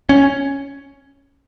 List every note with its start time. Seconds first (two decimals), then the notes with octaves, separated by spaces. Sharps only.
0.09 C#4